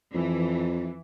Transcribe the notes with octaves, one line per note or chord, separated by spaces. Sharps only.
F2 E3